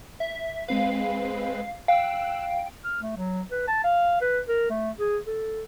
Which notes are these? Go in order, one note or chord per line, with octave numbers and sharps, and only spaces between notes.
E5
G#3 C4 B4 F5
F5 G5 E6 F#6
F6
A3
F#3
B4
A5
F5
B4
A#4
A3
G#4
A4